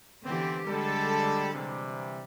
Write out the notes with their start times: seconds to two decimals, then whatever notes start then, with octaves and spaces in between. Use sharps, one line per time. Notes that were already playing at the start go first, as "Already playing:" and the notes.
0.24 D3 E3 B3 C4 G4
0.67 D3 G3 G#3 A4
1.54 C3 E3 G3